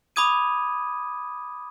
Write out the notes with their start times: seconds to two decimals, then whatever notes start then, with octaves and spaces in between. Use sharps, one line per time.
0.16 B5 D6 D#6 G#6 D#7